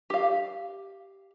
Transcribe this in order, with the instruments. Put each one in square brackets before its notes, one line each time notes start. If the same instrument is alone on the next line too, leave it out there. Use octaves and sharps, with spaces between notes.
[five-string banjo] G4 F5